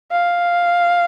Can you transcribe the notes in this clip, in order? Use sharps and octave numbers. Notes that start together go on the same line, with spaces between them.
F5